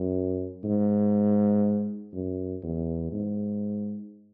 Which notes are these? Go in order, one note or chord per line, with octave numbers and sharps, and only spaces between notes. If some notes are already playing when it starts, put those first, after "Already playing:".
Already playing: F#2
G#2
F#2
E2
G#2